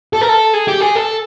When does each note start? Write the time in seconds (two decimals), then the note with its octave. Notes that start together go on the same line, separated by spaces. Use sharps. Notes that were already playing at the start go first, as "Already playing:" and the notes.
0.13 A4
0.21 A#4
0.29 A4
0.54 G#4
0.68 G4
0.81 G#4
0.96 A4